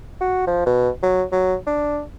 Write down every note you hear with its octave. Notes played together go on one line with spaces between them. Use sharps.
F#4
F3
B2
F#3
F#3
D4